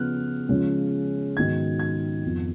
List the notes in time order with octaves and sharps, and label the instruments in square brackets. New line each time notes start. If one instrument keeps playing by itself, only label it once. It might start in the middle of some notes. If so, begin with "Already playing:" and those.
Already playing: [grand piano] C#3 F3 B3 F6 F#6
C#3 F3 G#3 C#4
G#2 D#3 F#3 B3 G#6
G#6
F2 F3 B3